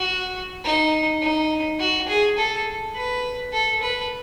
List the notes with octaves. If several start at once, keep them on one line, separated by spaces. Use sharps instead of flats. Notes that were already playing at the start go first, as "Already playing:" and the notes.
Already playing: F#4
D#4
D#4
F#4
G#4
A4
B4
A4
B4